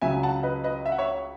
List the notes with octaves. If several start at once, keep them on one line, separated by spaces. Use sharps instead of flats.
C#2 C#3 F#3 E5 G#5
F#5 A5
B4 D#5
B4 D#5
E5
F#5
C#5 E5